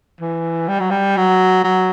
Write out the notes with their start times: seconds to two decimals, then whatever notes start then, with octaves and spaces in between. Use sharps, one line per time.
0.21 E3
0.68 G3
0.80 F#3
0.90 G3
1.17 F#3
1.64 F#3